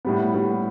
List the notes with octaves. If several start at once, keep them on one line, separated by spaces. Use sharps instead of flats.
A2 G3 B3
A2 G3 B3